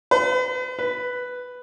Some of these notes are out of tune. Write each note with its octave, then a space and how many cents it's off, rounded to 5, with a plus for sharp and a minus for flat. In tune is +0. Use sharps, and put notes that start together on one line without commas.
B4 +45
B4 +5